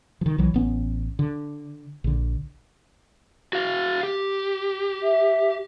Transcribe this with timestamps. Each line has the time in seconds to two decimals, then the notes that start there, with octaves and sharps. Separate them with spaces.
0.21 D#3 F3
0.38 B1 E3 F#3
0.54 A1 B3 C#4
1.19 D3
2.04 A#1 D3
3.53 F#4 F5
4.03 G4
5.03 E5